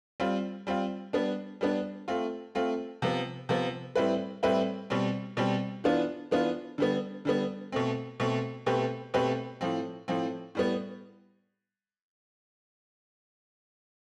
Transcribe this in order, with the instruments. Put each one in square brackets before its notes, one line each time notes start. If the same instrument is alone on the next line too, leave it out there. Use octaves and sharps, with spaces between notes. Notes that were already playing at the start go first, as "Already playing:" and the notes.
[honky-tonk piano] G3 C4 F4
G3 C4 F4
G3 B3 D4
G3 B3 D4
A3 C4 F4
A3 C4 F4
C3 F3 B3
C3 F3 B3
A2 G3 C4 E4 B4
A2 G3 C4 E4 B4
B2 G3 C4
B2 G3 C4
E3 B3 D4 F4
E3 B3 D4 F4
D3 G3 B3
D3 G3 B3
B2 A3 C4
B2 A3 C4
B2 A3 C4 G4 B4
B2 A3 C4 G4 B4
A2 F3 C4
A2 F3 C4
A2 G3 B3